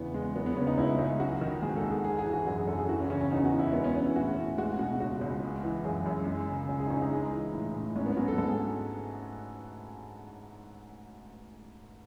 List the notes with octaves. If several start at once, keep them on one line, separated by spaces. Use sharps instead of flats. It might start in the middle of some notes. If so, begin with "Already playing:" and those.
Already playing: E2 C#3 E3 B3
G#3
F#3 B3
B3
C#3 C#4
D#4
C#2 E4
C#2
F#3 F#4
D#3
G#2 G#4
A4
G#2
G#4
G#3 G#4
G#4
E3
F#4
F#2 F#4
G#4
F#2 A4
G#4
E3 F#4
C#4
C#3 C#4
C#4
E2 D#4
F#4
E2
E4
G#3 B3
C#4
E3 C#4
E4
A2 F#4
A2
G#3 F#4
B2 F#4
C#2 F#4
C#2
G#3
E3
F#2 G#4
F#2
G#3
C#3
C#2
G#4
D#4
C#2 C#4
D#4
G#3
E3
A2
A2
G#2 C#4
B3
F#3 C#4
A4
G#2 A4
G#4